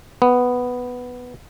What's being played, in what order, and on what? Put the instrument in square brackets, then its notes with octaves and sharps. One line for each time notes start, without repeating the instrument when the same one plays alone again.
[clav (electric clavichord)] B3